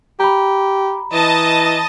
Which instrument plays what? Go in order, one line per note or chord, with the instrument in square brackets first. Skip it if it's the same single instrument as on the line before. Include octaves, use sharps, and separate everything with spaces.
[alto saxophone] G4 [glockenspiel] A#5 B5
[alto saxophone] E3 [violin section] D#5 A5